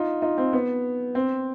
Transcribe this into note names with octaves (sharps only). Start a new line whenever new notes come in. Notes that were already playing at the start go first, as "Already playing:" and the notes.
Already playing: D#4 F4
D#4 F4
C4
B3
C4